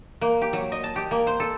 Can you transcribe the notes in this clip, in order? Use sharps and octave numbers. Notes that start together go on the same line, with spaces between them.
A#3
G4
F#3
D#5
A5
G4
A#3
C5
A4